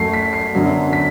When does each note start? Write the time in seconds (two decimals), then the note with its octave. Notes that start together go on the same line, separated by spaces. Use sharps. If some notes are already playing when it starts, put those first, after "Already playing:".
Already playing: F#2 F#3 A3 C7
0.13 B6
0.33 C7
0.53 F#2 D3 F#3 B3
0.93 B6